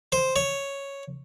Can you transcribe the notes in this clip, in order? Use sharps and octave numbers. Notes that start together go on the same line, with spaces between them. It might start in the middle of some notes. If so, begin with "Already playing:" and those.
C5
C#5